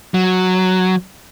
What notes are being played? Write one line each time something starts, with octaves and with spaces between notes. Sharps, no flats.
F#3